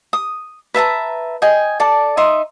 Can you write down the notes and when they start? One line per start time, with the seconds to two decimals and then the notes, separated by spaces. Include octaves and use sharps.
0.13 D#6
0.74 B4 E5 A5 A#5
1.42 D#5 G5 G#5
1.80 A4 D5 A5
2.17 D#4 E5 C6 D#6